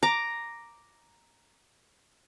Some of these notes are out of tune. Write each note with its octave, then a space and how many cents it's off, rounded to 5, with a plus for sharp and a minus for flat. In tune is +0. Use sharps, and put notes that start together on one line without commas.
A#5 +0 D6 +0